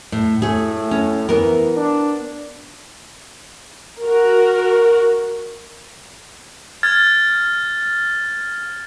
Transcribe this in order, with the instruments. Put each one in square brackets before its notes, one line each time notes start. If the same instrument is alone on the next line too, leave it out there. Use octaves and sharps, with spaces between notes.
[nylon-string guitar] A2
[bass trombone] A2 [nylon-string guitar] A3 G#4
[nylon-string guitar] C#4
[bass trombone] E3 [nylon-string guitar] B3 A#4
[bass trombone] D4
[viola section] F#4 A#4
[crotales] F6 G#6 A6